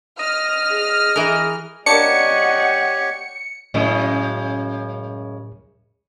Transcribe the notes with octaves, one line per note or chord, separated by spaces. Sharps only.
D#5 F6
G#4
E3 A#4
A#3 D4 G4 C#5 D#5 F#5 C#6 C#7
F#2 A2 C#3 G#3